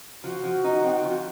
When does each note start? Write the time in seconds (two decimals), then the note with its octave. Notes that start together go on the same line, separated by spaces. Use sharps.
0.23 F3 F#4
0.44 F3
0.64 D#4
0.84 C4
1.03 F3